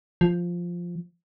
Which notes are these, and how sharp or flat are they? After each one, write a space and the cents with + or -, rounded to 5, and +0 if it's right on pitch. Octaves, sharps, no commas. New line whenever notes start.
F3 +0